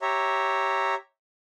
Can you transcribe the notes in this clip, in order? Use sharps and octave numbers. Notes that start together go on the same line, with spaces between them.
G4 C#5 E5 A#5